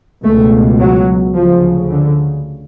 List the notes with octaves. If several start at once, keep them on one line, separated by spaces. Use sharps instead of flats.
C#2 B2 A3
F#3
D2 C#3 F3
D3